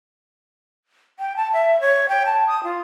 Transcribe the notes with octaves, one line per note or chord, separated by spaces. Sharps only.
G5
A5
E5
C#5
G5
A5
D#6
F4